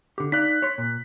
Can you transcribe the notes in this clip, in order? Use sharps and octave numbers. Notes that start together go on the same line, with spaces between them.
D3 G4
D#4 D5 F5 F#6 B6
C#5 C6
A#2